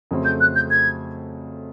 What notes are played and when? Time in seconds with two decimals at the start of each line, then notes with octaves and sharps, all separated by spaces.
0.11 F2 C#3 F#3 A3 C4
0.25 G6
0.41 F#6
0.56 G6
0.71 G#6